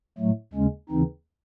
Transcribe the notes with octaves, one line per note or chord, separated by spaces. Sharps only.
A2 F#3 A3
D#2 C#3 G#3 C#4
D#2 C#3 E3 C4 D#4